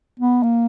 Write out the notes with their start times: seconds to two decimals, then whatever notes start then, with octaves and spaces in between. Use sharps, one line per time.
0.20 B3
0.43 A#3